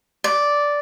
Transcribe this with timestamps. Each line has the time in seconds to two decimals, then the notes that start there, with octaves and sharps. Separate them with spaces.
0.24 D5